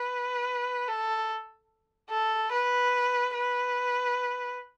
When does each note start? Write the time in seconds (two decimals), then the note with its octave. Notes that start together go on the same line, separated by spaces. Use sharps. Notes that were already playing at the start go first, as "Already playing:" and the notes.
Already playing: B4
0.88 A4
2.10 A4
2.52 B4
3.34 B4